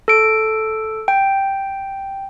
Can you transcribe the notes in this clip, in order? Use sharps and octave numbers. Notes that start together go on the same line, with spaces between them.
A4 D7
G5